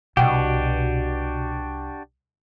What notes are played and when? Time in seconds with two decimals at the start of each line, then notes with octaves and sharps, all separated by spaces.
0.17 C2 B2 D4 F#4 G4 F#5 G5